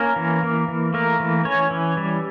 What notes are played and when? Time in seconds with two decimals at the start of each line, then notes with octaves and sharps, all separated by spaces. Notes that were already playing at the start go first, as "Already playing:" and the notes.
Already playing: A#3 C#4 A#4
0.16 E3
0.43 A#3
0.68 E3
0.94 A3 A#3 A#4
1.20 E3
1.45 E3 C#4 C#5
1.71 E3
1.97 G3